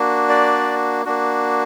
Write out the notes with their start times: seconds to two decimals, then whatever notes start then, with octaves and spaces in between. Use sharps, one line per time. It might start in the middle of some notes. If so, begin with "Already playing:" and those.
Already playing: A#3 D4 F#4
0.29 D5
1.05 A#3 D4 F#4